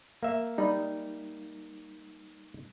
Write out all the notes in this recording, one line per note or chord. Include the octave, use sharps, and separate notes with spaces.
A#3 E5 F5
G3 D#4 D5 B5